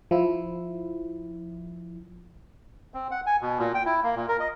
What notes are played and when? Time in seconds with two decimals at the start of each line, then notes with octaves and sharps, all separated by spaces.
0.11 F3 E4
2.94 C4
3.11 F#5
3.26 G#5
3.41 B2
3.58 A#2
3.75 G5
3.86 E4
4.03 A#3
4.16 A#2
4.28 A#4
4.40 D#5